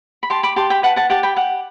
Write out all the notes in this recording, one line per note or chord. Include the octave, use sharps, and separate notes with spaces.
B5
G4 A5 C6
B5 D6
G4 A5 C6
G5 B5
B4 F#5 A5
F#5 A5
G4 F#5 A5
G5 B5
G4 F#5